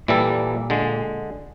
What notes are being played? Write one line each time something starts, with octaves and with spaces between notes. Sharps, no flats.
A#2 E3 G3 A4
D3 G#3